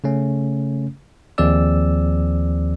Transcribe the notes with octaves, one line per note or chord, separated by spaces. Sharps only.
C#3 A3 C#4
D#2 F3 C4 G#4 D5 E6